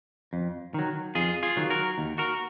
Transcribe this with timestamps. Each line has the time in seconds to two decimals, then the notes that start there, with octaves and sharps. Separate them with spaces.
0.33 F2
0.74 D#3 F#3
1.15 F2 F4 G#4
1.43 F4 G#4
1.57 D#3 F#3
1.70 F#4 A#4
1.98 D#2
2.18 F#4 A#4